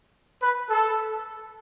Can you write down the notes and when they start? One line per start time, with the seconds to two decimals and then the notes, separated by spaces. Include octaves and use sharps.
0.41 B4
0.70 A4